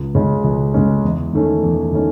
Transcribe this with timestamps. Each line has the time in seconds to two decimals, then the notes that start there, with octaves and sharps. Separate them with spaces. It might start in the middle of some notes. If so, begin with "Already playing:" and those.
Already playing: C#2
0.15 C#3 G#3 C#4
0.44 C#2
0.74 C#3 G#3 C#4
1.04 E2
1.33 D#3 A3 C#4
1.63 E2
1.93 D#3 A3 C#4